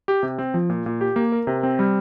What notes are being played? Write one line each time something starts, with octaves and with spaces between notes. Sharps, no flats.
G4
C3
C4
F3
A#2
A#2
G4
A#3
A#4
C3
C4
G3